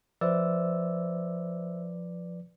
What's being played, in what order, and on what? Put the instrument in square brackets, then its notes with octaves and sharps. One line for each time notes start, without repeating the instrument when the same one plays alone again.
[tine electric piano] F3 B4 D5 [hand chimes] C5 E5 E6